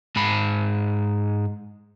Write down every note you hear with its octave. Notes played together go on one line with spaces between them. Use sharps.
G#2 B5